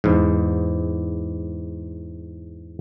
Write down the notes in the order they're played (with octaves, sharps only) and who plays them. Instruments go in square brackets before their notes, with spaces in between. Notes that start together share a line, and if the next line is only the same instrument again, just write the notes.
[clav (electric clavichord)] E2 G#2